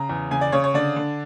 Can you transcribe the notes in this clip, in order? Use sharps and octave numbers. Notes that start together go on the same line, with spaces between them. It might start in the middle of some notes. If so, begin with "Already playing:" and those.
Already playing: C#3 A#5
E2
C#3 G#5
D5
C#3 C#5
C#5
D3 D5
D3